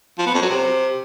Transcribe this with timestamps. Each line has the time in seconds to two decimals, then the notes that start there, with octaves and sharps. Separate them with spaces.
0.18 F3
0.26 B3
0.34 F2
0.42 F#3
0.50 C3